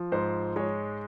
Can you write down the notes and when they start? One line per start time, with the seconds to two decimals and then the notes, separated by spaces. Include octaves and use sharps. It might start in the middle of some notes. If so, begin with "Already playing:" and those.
Already playing: F3
0.12 G#2 C5
0.56 G#3 C#5